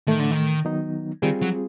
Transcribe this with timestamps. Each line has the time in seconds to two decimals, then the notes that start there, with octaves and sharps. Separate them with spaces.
0.07 A2 D#3 E3 A3
0.19 D3
0.31 D#3
0.65 D#3 F#3 B3 D#4
1.22 D#3 G3 C4 F4 G#4
1.42 F#3